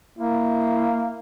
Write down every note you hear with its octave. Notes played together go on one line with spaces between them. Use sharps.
A#3 E4